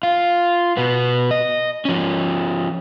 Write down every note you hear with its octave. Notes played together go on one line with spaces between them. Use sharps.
F4
B2 B3
D#5
F3 C#4